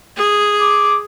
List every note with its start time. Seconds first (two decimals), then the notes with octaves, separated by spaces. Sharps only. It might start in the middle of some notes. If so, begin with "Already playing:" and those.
0.17 G#4
0.61 D6